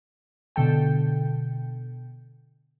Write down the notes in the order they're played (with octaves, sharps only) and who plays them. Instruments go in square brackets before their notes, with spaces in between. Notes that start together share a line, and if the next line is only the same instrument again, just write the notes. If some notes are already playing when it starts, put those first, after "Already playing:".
[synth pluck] B2 D3 A4 G5